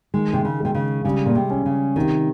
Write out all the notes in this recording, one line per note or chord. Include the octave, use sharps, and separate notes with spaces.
D#3 G#3
C3
C#3
C3 G#3
C#3
C#3 G3
A#2
C3
C#4
C#3
C3 D#3